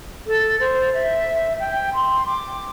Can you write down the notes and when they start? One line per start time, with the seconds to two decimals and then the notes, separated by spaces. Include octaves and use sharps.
0.26 A4
0.59 C5
0.93 E5
1.59 G5
1.93 C6
2.26 D6